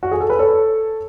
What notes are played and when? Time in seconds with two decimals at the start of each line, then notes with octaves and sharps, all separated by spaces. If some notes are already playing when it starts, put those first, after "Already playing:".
0.03 F#4
0.11 G#4
0.20 A4
0.30 B4
0.39 A4 C#5